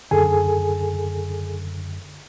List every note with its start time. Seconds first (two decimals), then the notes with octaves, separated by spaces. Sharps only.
0.11 F#2 D3 G#4 A4 G#5